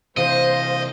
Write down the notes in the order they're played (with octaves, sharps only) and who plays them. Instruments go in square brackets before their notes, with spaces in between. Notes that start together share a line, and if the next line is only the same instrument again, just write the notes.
[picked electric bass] C3 E3 [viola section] C5 [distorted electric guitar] D#5 [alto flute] F5